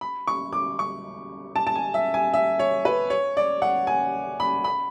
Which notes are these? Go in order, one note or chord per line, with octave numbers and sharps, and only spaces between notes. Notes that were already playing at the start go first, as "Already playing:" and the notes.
B5
C#6
D6
C#6
A5
A5
G#5
E5
G#5
E5
C#5
B4
C#5
D5
F#5
G#5
B5
B5